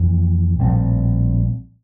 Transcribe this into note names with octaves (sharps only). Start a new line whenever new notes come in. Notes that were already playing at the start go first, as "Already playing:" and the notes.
Already playing: F2 E3 A#3
A#1 A2 G3 C4